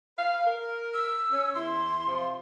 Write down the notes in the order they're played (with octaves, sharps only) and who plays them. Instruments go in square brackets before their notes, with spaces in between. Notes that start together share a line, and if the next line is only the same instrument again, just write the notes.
[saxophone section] B4 F5
A#4
[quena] E6
[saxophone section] C#4
[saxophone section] E2 E4 [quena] C6
[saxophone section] C3 F3